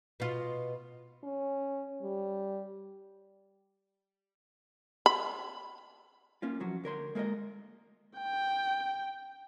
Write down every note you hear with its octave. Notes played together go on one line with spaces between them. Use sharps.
B2 F4
C#4
G3
B5
A#3 C#4 F4
C2 F3 F#3 F#4
D2 A#4 C#5 C6
G#3 A#3 A#4 C#5 D#5
G5